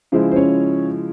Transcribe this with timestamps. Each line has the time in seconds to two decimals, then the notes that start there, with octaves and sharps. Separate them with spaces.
0.12 C#3 F3 G#3 E4 C5
0.31 C5
0.36 C#4 C#5